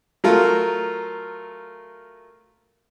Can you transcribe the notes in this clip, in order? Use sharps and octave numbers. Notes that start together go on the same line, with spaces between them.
F#3 A3 F4 A#4